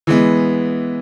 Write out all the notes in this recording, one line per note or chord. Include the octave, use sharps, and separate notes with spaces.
E3 G#3 B3